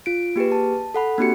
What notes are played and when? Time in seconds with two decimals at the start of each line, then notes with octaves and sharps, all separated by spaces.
0.06 F4 D7
0.36 A#3 G4 G#4 B4
0.52 A5
0.94 A4 F#5 B5
1.18 A#3 C4 D4 F#4 G4 C#7